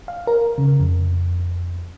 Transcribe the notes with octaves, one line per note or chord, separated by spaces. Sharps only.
F5
A#4
C#3
F2